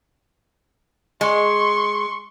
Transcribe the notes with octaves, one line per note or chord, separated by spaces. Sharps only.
G#3 C6 C#6